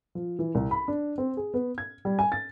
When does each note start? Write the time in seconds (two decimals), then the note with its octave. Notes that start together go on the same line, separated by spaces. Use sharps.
0.15 F3
0.39 E3
0.55 C2
0.71 B5
0.88 D4
1.18 C4
1.37 G#4
1.54 B3
1.78 G#6
2.05 G3
2.19 G#5
2.32 A6